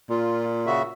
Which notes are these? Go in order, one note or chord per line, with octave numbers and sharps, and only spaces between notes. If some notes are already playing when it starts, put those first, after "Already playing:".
A#2 F4
C#3 F#4 E5